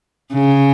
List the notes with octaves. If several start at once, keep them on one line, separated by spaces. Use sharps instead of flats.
C#3